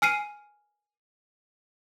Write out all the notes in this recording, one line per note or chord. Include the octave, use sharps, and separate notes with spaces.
G#5 F6 C7 D#7